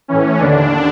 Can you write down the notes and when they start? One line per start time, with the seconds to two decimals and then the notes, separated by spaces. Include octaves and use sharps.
0.08 A2 E3 C#4
0.39 D#2 D3 D4